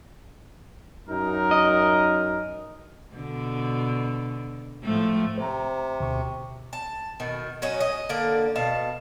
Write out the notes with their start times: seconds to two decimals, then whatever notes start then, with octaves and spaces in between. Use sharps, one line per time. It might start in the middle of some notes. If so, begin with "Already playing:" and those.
1.08 F#2 D#4 A#4
1.51 D#5
3.16 B2 D3
4.84 A2 F3 A3
5.38 C3 C5 A#5
6.00 D2 B2 C#6
6.73 A5
7.20 B2 D#3
7.62 F#3 C#4 D#4
7.81 D#5
8.09 D3 A#3 D5
8.56 B2 F5 A5